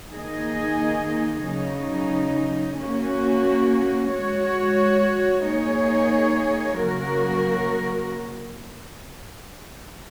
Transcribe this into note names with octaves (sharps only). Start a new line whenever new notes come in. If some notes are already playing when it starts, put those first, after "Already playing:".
D#3 A#3 D#4 G#4 D#5
C#3 F#3 D#4
A#3 C#4 F#4
G#3 F#4 C#5
A#3 D#4 G#4 C#5
C#3 F#3 A#3 F#4 A#4